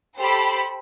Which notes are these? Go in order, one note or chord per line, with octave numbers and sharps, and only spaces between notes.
G4 A4 C5 B5